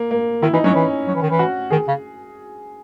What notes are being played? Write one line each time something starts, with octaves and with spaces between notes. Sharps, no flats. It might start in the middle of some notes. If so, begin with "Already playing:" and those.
Already playing: A#3
A#3
D#3 E4
E3 D#4
F#3 C#4
E3
F#3
E3
D#3
E3
F#4
D#3 G#4
C#3